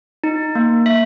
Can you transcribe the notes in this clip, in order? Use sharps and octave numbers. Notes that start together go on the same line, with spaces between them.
D#4
A#3
E5